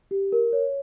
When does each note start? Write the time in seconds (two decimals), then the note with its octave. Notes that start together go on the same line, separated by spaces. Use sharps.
0.11 G4
0.32 A#4
0.53 C#5